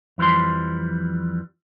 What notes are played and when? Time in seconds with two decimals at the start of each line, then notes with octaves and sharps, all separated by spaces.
0.18 F2 E3 F3 G3 C6